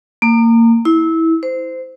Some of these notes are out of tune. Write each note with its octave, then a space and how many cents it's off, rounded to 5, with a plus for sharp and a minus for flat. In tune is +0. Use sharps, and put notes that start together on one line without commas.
A#3 -25
E4 -20
C5 -20